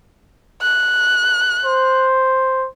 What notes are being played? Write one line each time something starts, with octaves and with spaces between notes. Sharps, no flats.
F#6
C5